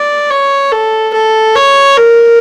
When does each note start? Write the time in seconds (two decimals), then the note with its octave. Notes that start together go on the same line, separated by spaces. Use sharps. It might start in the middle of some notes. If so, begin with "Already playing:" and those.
Already playing: D5
0.30 C#5
0.72 A4
1.14 A4
1.55 C#5
1.98 A#4